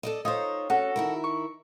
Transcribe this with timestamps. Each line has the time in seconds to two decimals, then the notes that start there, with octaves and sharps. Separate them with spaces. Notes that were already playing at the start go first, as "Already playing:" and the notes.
0.03 A4 D5 D#5
0.25 D#4 F4 C5 C#5
0.70 C#4 F#4 A4
0.96 D#3 E4 A#4
1.24 C#6